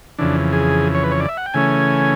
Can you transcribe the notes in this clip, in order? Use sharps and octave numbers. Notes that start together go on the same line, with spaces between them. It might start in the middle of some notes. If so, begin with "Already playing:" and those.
F2 C#3 E3 D4
G#4
C#5
B4
C#5
D5
E5
F#5
G5
C#3 E3 A3 C#4 G#5